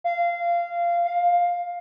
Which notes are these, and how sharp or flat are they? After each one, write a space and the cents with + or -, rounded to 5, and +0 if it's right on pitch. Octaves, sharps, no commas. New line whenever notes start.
F5 -20
F5 +10